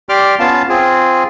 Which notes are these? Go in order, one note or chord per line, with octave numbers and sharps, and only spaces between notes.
G4 D5 C6 D6 F6
B3 C#4 F4 F5 A5
C4 F4 G#4